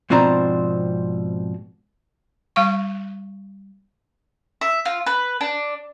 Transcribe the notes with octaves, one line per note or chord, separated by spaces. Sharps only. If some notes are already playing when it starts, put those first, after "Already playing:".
G#2 B2 F3 C4 D4 A#5
G3 F5 C#6
E5
F4
B4
D4